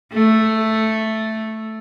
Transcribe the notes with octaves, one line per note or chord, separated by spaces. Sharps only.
A3